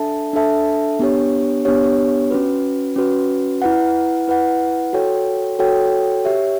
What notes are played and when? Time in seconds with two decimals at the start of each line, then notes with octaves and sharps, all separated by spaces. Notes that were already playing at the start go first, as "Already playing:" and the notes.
Already playing: D4 A4 E5 A5
0.33 D4 A4 E5 A5
0.99 B3 D4 G4 C#5
1.65 B3 D4 G4 C#5
2.31 C#4 F#4 B4
2.96 C#4 F#4 B4
3.62 E4 B4 F#5
4.28 E4 B4 F#5
4.93 F#4 A4 C#5 G5
5.59 F#4 A4 C#5 G5
6.25 G4 C#5 E5